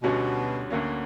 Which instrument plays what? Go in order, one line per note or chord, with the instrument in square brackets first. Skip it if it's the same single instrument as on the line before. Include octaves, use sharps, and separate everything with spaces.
[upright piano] D2 D3 G3 C#4 F#4 [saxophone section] B2
[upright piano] D2 D3 A#3 C#4